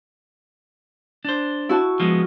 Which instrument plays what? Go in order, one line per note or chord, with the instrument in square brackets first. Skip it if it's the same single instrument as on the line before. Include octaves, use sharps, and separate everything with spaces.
[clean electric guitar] D4 C5
[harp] E4 F#4 A5
[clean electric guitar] F3 G#3 B3